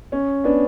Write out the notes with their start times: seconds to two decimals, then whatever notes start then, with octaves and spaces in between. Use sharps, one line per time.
0.12 C#4
0.44 B3 D4